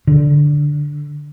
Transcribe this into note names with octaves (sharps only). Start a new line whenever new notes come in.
D3